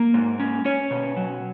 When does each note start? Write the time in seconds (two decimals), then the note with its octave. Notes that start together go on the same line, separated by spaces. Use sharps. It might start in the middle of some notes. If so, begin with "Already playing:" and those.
Already playing: A#3
0.14 G#2
0.39 C#4
0.65 C#4 C#5
0.91 B2
1.17 F#3